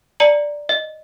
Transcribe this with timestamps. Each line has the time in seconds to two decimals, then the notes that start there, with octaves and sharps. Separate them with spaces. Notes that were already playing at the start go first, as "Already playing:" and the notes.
0.20 D5 A#5 C#7 F#7
0.69 D#5